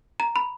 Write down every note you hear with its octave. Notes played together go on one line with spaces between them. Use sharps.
A#5
B5